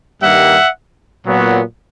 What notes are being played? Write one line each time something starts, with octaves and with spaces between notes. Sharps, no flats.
G2 D#3 G3 A#3 E5 F#5
A#2 F#3 B3